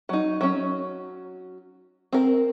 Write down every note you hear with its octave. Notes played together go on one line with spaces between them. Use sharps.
F#3 D#4
F#3 C#4
C4 A#4